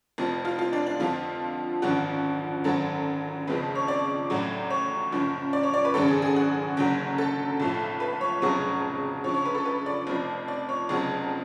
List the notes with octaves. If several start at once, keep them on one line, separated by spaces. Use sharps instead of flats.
F1 F2 F3
F4
F4
D4
D4
F2 D3 F3 F4
G#1 F#2 D3 F3 F#4
G#1 F#2 D3 F#3 A4
F#1 F2 C#3 F3 B4
C#5
D5
A1 A2 F#3
C#5
F#1 F#2 F3
D5
C#5
D5
B4
G#1 F#2 C#3 A4
G#4
G#4
F#4
F#1 F#2 D3 F#3
A4
B1 A2 F3
B4
C#5
F1 F2 C#3 F#3 C#5
D2 C#3 F3 C#5
C#5
B4
A4
B4
D5
F1 F2 F3
D5
C#5
F1 F2 C#3 F#3